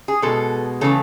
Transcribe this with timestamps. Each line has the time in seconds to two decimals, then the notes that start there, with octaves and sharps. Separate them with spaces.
0.08 G#4
0.22 B2 G#3 A4
0.81 C#3 E3 A3 A4